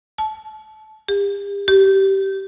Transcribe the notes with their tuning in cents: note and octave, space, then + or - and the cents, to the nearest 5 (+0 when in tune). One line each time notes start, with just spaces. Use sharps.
A5 -25
G4 +40
G4 -15